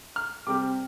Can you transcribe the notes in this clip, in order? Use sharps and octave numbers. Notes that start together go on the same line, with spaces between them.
F6
C3 G3 C4 D6